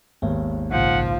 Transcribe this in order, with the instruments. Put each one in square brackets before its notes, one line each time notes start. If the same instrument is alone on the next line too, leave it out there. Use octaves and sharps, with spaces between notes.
[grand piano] G#1 D#2 [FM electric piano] B3
[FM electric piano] A#1 G#2 C#3 [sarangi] F3 [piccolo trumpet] F#5